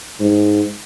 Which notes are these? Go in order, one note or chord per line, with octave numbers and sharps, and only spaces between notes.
G#2